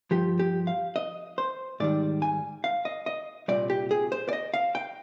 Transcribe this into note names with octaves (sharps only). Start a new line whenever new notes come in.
G2 F3 G4
G4
F5
D#5
C5
G#2 D#3 G3 D5
G#5
F5
D#5
D#5
C2 A#2 G3 D5
G4
G#4
C5
D5
D#5
F5
G5